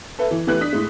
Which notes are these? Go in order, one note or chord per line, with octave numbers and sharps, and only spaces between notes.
A4 B4 E5
E3
E3 A3 G4 B4 F#6
D4 D#6 B6
A2 G#3